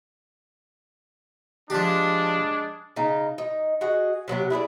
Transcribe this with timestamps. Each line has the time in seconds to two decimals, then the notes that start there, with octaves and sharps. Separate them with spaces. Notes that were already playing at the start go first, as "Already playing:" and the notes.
1.70 F3 G#3 D4 G4
2.96 C#3 D#4 A#5
3.38 D#4
3.81 F#4 G#4 D#5
4.28 C3 F#3 B3 G4
4.50 E4 G#4 A4 D5